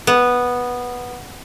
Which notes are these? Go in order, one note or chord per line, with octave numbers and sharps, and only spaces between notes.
B3